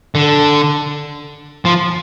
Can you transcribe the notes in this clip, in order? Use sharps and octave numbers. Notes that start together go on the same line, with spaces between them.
D3
F3